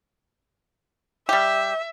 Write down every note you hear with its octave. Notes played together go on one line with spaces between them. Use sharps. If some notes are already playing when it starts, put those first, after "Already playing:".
G3 G4 E5